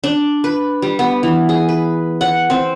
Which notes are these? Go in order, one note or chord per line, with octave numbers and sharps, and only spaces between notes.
D4
B4
G3
B3
E3
G#4
B4
F#5
C4